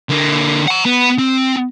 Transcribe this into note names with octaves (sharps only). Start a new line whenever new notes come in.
D3 A#3
F#5 A#5
B3
C4